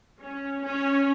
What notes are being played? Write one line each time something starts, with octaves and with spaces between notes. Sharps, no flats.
C#4
C#4